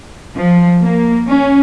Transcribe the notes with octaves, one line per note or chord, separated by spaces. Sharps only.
F3
A#3
C#4